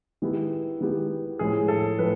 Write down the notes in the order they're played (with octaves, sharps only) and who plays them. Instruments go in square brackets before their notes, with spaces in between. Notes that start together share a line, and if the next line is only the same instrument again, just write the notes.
[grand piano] D#3 G#3 B3 E4 G4
D#3 G#3 B3 E4 G4
[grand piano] A2 F3 G#3 C#4 E4 [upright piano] G#4
[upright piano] A4
[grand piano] A2 F3 G#3 [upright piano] B4